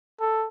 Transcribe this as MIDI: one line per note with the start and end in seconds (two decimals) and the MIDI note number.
0.21 0.47 69